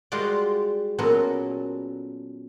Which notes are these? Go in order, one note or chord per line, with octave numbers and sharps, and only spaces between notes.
G3 G#3 F4 F#4 D5
A#2 F#3 B3 C#4 A4 A#4